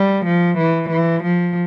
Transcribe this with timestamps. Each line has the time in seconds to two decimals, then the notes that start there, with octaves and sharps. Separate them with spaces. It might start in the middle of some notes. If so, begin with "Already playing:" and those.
Already playing: G3
0.25 F3
0.58 E3
0.89 E3
1.23 F3